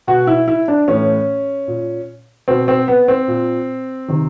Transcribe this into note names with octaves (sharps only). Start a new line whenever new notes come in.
B2 F#4
E4
E4
D4
A2 E3 C#4
A#2
B2 C4
C4
B3
C4
A#2
C3 D#3